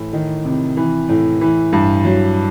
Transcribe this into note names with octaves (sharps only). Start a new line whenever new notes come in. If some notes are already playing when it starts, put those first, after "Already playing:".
Already playing: A2 E3
D#3
C3
E3
A2
E3
G2
F#3